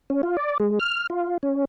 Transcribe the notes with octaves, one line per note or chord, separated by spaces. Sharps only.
C#4
F4
D5
G#3
F6
F4
C#4